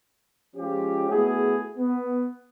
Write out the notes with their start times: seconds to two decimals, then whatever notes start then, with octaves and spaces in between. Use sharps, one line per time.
0.56 F3 G#3 C#4 F4 G4
1.09 A3 B3 E4 F#4 G#4
1.78 B3